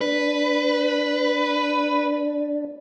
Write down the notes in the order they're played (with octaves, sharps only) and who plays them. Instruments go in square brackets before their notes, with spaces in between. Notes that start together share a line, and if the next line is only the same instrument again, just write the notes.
[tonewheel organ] D4 [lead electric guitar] B4